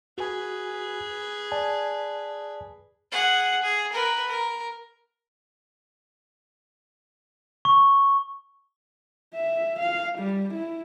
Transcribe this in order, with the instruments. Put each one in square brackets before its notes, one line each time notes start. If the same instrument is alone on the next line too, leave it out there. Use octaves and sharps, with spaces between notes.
[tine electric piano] F#4 G#5 [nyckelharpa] G#4 B4
[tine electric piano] D5 G#5 A5
[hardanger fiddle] G#4 F#5
G#4
A#4 B4
A#4
[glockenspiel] C#6
[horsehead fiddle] E5
F5
G3
E4